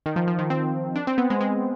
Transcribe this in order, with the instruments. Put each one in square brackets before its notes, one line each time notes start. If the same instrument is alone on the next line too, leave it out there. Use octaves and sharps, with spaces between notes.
[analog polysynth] D#3
F3
F3
D#3
C4
D4
C4
B3
G#3
G#3